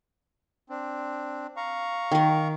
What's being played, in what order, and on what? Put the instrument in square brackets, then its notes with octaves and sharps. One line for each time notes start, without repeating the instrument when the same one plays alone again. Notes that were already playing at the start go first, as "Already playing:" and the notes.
[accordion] C4 D4
F5 A#5 C#6
[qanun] D#3 A#4